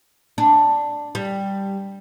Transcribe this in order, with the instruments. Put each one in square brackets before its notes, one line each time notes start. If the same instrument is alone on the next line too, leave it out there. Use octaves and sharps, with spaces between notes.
[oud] D4
G3